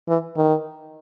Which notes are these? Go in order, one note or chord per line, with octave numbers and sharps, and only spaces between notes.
E3
D#3